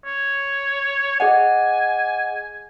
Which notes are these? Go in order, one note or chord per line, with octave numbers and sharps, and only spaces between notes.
C#5
G#4 D#5 F#5 G#5